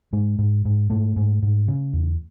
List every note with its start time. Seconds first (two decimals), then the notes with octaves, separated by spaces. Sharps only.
0.13 G#2 G#3
0.39 G#2
0.65 G#2
0.90 G#2 A3
1.16 G#2
1.42 G#2
1.68 C#3
1.93 E2